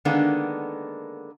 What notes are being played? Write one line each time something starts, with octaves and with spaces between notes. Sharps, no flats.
D3 D#3 G#3 A#3 B3 D4